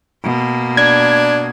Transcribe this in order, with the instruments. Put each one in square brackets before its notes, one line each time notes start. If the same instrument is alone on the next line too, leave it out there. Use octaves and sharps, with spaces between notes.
[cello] B2 A#3
[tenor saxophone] D4 [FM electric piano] G#6